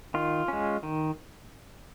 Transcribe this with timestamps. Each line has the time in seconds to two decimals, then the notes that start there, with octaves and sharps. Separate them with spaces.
0.14 D#3 F4
0.48 G#3 C#4
0.83 D#3